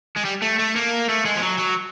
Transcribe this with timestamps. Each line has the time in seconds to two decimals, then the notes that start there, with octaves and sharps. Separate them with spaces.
0.16 G#3
0.25 G3
0.42 A3
0.59 A3
0.76 A#3
1.09 A3
1.25 G#3
1.37 F3
1.43 F#3
1.59 F#3